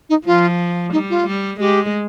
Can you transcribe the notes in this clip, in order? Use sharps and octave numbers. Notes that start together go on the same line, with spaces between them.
D#4
F3 F4
G3 D#4
F4
G3
G#3 G4